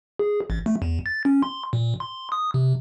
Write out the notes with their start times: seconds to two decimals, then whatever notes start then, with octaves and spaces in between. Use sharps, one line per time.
0.19 G#4
0.50 A1
0.66 A3
0.82 E2
1.06 A6
1.25 C#4
1.43 C6
1.73 A#2
2.00 C6
2.32 D#6
2.54 C3